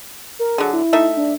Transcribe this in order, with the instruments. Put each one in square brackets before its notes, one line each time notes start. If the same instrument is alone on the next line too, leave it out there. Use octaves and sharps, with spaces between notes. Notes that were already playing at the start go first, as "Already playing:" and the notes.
[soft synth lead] A#4
[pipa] D3 F#3 [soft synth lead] G#4
[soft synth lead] E4
[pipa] A3 D#4 E5
[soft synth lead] D4